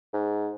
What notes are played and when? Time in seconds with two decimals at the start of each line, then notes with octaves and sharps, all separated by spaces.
0.14 G#2